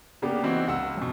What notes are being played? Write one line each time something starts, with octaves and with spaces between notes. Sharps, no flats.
C#3 A#3 B3 D4 G4
E3 B3 C4 D#4 E4 F#4
C#2 F#5 E6
F2 B2